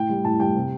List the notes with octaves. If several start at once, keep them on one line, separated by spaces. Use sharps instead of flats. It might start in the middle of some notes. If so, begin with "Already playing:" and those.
Already playing: A2 G5
G3
A2 A5
G3 G5
C3